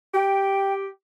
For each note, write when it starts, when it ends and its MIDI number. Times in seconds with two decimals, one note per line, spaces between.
0.14 0.87 67
0.14 0.73 79